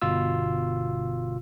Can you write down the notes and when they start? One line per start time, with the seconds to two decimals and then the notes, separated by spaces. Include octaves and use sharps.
0.02 G1 B2 F4 E6